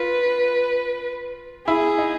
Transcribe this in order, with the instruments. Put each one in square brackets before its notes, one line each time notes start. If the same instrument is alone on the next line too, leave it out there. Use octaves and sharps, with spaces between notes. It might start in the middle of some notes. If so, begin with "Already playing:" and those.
Already playing: [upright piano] F4 [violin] B4
[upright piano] E4 [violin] G#4
[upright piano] D#4